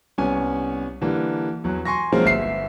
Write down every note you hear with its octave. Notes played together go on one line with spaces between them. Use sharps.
C2 B3 C#4 G#5
D3 E3 G3 A#3
E2 F#3
G#5 C6 C#6 A#6
F3 F#3 G#3 A#3 C4 C#4
G1 E5 C7